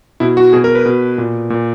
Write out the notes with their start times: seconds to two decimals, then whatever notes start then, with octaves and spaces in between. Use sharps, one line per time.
0.20 B2 E4
0.37 F#4
0.53 B2 G#4
0.64 A#4
0.75 B4
0.86 B2
1.18 A#2
1.50 A#2